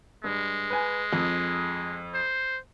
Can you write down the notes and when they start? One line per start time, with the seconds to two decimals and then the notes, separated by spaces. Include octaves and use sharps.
0.24 G2 G#3
0.70 B4 G#5
1.13 F2
2.14 C5